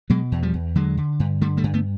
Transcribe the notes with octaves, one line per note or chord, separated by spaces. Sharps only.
B2 F#3 G#3
E2
F3 G3
E2
D3 F#3 G#3
D3
G2
D3 G3 A3
G3 A3
G2
A3 B3